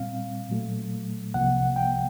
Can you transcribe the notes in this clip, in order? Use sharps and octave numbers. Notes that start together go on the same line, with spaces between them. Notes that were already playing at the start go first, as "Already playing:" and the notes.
Already playing: A#2 G3 C4 F5
A#2 F#3 A3
C2 C3 F3 A#3 F#5
G5